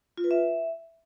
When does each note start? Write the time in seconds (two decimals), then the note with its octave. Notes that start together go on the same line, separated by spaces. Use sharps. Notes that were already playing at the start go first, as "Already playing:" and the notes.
0.18 F4
0.24 B4
0.31 E5